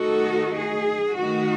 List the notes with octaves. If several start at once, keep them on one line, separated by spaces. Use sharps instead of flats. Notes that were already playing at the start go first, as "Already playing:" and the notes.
Already playing: D#3 A3 D#4 F#4 A4
G#4
D#3 A3 D#4 F#4